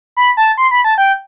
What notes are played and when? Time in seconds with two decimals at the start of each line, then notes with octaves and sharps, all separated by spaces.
0.17 B5
0.37 A5
0.58 C6
0.71 B5
0.84 A5
0.98 G5